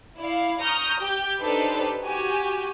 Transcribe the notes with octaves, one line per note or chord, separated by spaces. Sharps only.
E4 D5 F5
A#5 C#6 D#6 F6 G6 A#6
G4 G5 G6
D4 D#4 G4 A4 B4 C5
F#4 G4 G#5